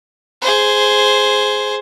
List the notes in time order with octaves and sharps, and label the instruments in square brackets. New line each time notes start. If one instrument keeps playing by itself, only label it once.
[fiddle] G#4 C5